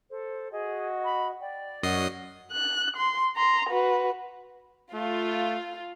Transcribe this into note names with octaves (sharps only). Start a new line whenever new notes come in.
A4 C5
F#4 G#4 D#5
B5
D5 G5
F#2 F#4 C#5 D#5 C7
F#6
C6
A#5 C6
F#4 B4
A3 F4